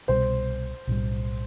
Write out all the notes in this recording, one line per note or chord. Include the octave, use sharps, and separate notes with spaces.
C2 B2 G3 C5
B1 A2 E3 G3